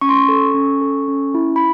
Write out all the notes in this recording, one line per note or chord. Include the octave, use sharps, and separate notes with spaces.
C#4 C#6
C6
C#6
A4
C#4
A4
C#4
E4
B5